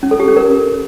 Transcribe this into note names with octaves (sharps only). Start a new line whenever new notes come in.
C#4
A4
G4
C#4
A#4